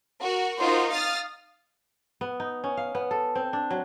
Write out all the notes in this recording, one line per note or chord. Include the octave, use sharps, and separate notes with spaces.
F#4 A#4
D#4 F4 F#4 A#4 C5
F5 D#6 F6 A6
B3
D#4
C#4
F5
B3
A4
C4
D4
F#3